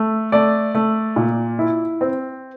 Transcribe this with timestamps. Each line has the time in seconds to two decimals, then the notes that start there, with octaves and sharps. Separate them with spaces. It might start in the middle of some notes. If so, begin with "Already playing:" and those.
Already playing: A3
0.32 A3 D5
0.75 A3
1.16 A#2
1.59 E4
2.01 C4